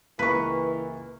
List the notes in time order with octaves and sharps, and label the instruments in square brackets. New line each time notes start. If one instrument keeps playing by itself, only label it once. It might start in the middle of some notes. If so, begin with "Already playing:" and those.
[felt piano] C#2 A#3 C#6 [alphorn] E3 [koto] B4